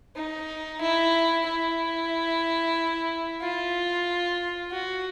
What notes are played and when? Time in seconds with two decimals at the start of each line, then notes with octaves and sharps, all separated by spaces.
0.15 D#4
0.81 E4
1.46 E4
3.41 F4
4.71 F#4